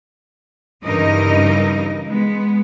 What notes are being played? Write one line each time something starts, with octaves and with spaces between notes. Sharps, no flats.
G2 C#3 E3 D#4 A#4 D#5
G#3 B3